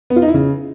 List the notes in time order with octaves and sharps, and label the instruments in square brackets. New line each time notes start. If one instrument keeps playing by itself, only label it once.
[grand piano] B3
F4
D#4
E4
C#3